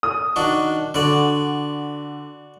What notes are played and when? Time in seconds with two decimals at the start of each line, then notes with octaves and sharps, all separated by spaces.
0.03 D#6
0.36 D#3 D4 F#4
0.94 D3 F#4 D5